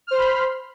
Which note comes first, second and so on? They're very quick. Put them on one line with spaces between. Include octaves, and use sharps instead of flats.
F6 C5 C6 B5